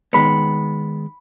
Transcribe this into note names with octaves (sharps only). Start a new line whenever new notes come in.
D#3 G#3 B3 B5 C#7